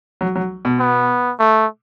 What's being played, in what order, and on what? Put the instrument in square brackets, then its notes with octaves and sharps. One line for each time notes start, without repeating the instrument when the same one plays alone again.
[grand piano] F#3
F#3
B2
[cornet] B3
A3